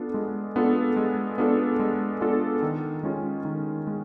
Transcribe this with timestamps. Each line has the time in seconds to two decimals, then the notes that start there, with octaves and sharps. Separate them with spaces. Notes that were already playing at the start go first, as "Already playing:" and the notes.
Already playing: B3 D4 F4 A4
0.14 G#3
0.56 B3 D4 F4 A4
0.96 G#3
1.38 B3 D4 F4 A4
1.79 G#3
2.21 B3 D4 F4 A4
2.62 D#3
3.03 G#3 C#4 F4
3.45 D#3
3.87 G#3